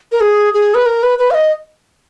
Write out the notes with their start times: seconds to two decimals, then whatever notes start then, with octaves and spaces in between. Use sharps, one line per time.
0.12 A#4
0.21 G#4
0.54 G#4
0.75 B4
0.86 A#4
1.03 B4
1.19 B4
1.31 F5
1.34 D#5